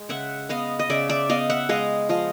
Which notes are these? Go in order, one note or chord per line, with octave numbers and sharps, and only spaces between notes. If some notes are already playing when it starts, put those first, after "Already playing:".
Already playing: G#3
C#3 E5 F#5
B3 D#5 F5
D#5
C#3 D5 E5
D5 E5
B3 D#5 F5
E5 F#5
G#3 D#5 F5
F3 D#5 F5